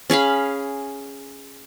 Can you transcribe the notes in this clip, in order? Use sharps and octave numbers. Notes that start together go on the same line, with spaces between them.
C#4 G#4 F5 B5